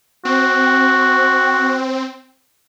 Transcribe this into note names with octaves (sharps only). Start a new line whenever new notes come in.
C4 F#4